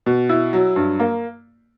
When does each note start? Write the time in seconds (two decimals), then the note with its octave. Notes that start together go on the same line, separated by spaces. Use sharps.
0.06 B2
0.29 E4
0.53 F#3
0.76 G2
1.00 A#3